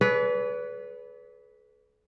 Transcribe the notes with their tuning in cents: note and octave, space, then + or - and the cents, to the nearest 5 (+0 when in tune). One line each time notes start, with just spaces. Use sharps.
G#4 +45 B4 +0 D5 -45